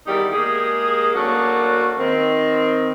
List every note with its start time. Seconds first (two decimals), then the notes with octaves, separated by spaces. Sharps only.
0.07 E2 D#3 G3 D#4 E4 G4
0.33 G#3 A#3 G4 G#4
1.15 F#3 A3 A#3 C#4 D4 F#4
1.99 D#3 C4